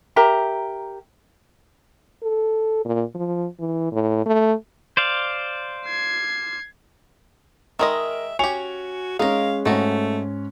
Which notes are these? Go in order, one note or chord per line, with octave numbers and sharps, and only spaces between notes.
G4 A#4 E5 A#5
A4
A#2
F3
E3
A2
A3
C5 D5 F5
G#6 C7
D#3 G#3 A#4 D#5 E5
C#4 F#4 G4 G#5 C#7 F7
G#3 C#4 D#4 A#4 F5
G#2 D#3 A3 C#4 F#4